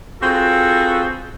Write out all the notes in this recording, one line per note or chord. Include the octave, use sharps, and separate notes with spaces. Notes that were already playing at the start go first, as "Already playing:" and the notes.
C4 F4 F#4 G#4 A4 B4